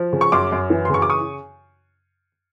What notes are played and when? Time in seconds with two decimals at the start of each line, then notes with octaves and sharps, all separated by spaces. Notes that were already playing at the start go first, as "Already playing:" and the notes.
Already playing: F3
0.13 C#3
0.21 C#6
0.32 F#2 C6 D6
0.52 F#2
0.70 E3
0.85 C6
0.90 C#3 C#6
1.02 D6
1.10 C#6 D#6